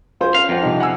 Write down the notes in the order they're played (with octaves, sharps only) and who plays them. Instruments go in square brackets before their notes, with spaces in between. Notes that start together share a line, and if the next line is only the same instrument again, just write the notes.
[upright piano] F4 G#4 C5
[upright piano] C#4 [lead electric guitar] F5
[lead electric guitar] F2 [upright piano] F4 C5 F#5
[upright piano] C3 D#4
F#5 G#5 E6